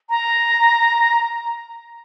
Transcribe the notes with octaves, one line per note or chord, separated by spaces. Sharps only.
A#5